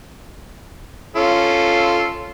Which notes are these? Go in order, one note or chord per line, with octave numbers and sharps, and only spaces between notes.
C#4 F4 A4